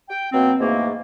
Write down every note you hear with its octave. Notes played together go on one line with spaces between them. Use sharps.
G5
B2 F#3 A#3 C4
E2 G#2 A3 A#3